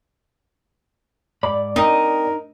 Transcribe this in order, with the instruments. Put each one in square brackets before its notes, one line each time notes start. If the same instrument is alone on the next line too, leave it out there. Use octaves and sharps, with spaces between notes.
[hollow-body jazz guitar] G#2 B5 [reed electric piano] D5
[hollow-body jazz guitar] C4 [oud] D#4 [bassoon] A#4